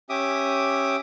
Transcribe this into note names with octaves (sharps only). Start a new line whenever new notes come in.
C#4 G4 E5 D6 D#6